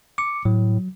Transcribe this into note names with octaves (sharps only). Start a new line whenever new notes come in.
D6 C#7
A2 F#3